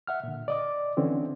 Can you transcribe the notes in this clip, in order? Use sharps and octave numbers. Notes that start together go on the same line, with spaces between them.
E5 F#5 F6
A#2 D3
D5 D#5 D6
D3 E3 C4 C#4